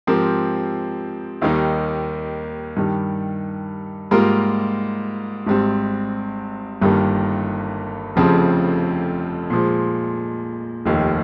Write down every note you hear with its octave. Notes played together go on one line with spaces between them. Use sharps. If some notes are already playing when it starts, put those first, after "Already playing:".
G#2 F3 C4 G4 A#4
D#2 D#3 G3 A#3 D#4
G2 D#3 G3
G#2 G3 A#3 F4 A#4
G#1 G#2 G3 C4
G1 G2 D#3 G3 A#3
F1 F2 C#3 F3 C4
A#2 F3 G#3
F1 D#2 D#3